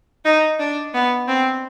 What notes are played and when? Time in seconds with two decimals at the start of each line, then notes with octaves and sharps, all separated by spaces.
0.25 D#4
0.60 D4
0.94 B3
1.28 C4